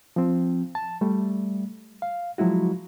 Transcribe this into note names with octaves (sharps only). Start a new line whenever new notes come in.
F3 C4
A5
G3 A3
F5
F3 F#3 G#3 E4 F#4